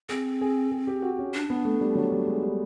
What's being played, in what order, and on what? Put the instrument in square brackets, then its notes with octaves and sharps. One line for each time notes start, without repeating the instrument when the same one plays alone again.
[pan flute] C4 [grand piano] G#4
[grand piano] G#4
G#4
G4
F#4
C#4
[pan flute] D4
[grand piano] B3
A3
G3
F#3
G3
G#3
G3